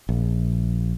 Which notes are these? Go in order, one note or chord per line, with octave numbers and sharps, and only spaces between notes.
A#1